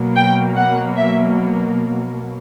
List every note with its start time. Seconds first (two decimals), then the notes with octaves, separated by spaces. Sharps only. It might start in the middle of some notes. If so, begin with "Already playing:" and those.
Already playing: B2 F#3 A#3
0.16 G5
0.56 F#5
0.97 E5